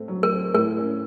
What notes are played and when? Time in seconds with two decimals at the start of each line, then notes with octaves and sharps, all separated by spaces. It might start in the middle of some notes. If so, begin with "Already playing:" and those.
Already playing: A2 A3 C4
0.08 F#3
0.23 A#4
0.31 C4
0.55 A2 A#4
0.78 C#4